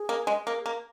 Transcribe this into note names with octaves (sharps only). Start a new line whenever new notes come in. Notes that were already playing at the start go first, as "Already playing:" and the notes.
Already playing: G#4
A#3
G#3
A#3
A#3